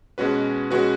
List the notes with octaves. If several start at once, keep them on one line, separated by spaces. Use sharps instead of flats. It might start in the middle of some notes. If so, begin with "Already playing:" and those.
B2 G#3 C#4 F#4 B4
B2 G#3 C#4 F#4 B4